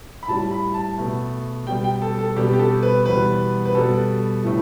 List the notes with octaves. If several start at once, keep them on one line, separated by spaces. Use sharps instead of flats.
B5
A2 G3 A5
B5
A5
B2 A3
B2 G3 G5
G5
A4
A4
B2 G3 G4
G4
A4
B4
E2 B2 G3 B4
B4
B2 G3 A4
A2 E3 A3